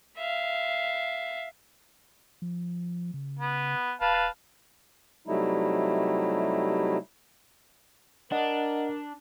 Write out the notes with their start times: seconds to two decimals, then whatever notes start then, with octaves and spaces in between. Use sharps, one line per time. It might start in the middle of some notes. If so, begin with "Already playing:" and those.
0.17 E5 F5
2.42 F3
3.14 C#3
3.39 B3
4.01 D#1 B4 F5 A5
5.27 C3 F#3 G3 A3 D#4 E4
8.32 D4 A#4 D#5 F#5